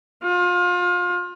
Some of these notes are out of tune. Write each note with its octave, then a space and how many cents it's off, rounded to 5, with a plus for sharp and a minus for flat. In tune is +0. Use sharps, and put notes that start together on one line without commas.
F4 +30